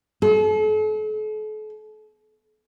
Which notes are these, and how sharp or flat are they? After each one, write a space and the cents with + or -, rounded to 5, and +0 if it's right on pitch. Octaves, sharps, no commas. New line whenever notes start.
A4 -40